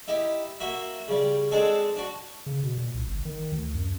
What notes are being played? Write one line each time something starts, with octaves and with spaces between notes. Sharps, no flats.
D#4 E4 G4
A#3 F#4 E5
C#3 G3
G#3 C4 D4 G#4 A4
D4 F#4
C#3
B2
A#2
C2
G1
D#3
D2
F#2